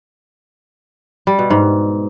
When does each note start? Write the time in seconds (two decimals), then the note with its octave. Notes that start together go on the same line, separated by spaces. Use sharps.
1.27 G3
1.39 B2
1.50 G#2